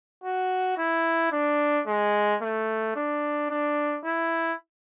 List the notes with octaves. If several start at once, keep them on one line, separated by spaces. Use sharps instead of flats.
F#4
E4
D4
G#3
A3
D4
D4
E4